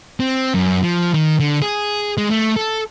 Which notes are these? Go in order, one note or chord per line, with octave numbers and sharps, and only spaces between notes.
C4
F#2
F3
D#3
D3
G#4
G#3
A3
A4